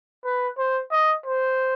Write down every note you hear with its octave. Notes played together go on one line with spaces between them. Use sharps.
B4
C5
D#5
C5